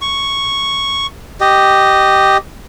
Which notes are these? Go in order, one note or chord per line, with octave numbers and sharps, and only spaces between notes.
C#6
G4 D#5